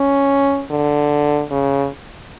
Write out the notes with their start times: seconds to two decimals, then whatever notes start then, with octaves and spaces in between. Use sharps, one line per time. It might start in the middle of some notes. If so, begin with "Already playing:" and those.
Already playing: C#4
0.71 D3
1.51 C#3